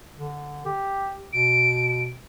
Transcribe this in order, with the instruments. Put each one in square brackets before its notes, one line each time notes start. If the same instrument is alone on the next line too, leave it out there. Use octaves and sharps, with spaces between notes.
[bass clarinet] D3
G4
[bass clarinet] B2 [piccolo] D7